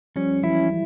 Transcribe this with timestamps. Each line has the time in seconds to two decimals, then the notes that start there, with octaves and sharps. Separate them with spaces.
0.16 F3 G3 C#4
0.43 E3 F#3 E4